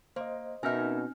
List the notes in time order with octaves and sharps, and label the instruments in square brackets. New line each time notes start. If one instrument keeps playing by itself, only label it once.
[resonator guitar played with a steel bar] A#3 [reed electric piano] C5 D#5
[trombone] B2 [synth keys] C4 C#4 D#4 [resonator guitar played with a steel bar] A#4 E5 [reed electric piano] G#5 F6